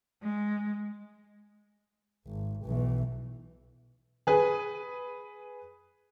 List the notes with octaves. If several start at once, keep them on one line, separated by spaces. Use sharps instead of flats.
G#3
G#1
B1 E3
G#4 B4 G#5